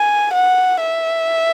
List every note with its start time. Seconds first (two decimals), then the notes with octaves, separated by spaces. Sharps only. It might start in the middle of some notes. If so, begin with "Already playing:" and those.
Already playing: G#5
0.34 F#5
0.81 E5